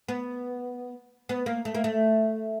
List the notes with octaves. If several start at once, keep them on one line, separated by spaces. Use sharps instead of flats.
B3
B3
A#3
A3
A#3
A3